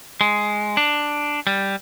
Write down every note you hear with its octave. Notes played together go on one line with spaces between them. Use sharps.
G#3
D4
G3